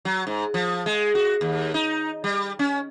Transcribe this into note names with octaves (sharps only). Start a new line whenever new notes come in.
F#3
G#2
F3
G#3
F#4
D#2
D#4
G3
C#4